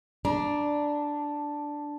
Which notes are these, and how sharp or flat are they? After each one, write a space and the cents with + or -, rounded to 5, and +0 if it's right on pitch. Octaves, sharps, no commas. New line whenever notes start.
D4 +0 A#5 +25